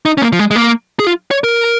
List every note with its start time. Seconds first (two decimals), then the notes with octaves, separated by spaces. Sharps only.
0.05 D#4
0.18 C#4
0.22 A#3
0.33 F3
0.39 G#3
0.51 G#3
0.56 A#3
1.00 G#4
1.06 F4
1.31 C#5
1.44 A#4